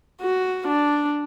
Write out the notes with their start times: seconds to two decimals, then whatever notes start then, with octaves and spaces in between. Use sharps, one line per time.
0.22 F#4
0.68 D4